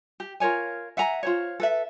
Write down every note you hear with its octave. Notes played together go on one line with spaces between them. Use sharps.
G4
F4 A#4 C#5 G#5
E5 F#5 G#5 A#5
F4 C5 C#5
A4 B4 E5